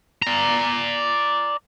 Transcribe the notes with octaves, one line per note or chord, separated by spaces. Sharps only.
D5 A#5